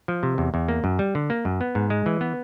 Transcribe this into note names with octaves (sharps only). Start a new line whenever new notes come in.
F3
C3
E2
E2
A#3
F#2
G3
D3
A#3
F#2
B3
G#2
G#3
E3
B3